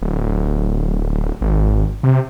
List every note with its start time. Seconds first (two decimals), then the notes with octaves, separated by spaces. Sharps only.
0.02 D1
1.41 G#1
2.03 C3